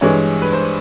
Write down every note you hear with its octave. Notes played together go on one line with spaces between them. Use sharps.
G2 E3 G#3 C#5
B4
C5